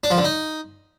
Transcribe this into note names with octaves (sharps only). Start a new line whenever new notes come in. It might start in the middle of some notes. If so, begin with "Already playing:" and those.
D4
F3
D3
D#4